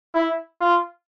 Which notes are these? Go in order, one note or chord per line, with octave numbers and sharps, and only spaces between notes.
E4
F4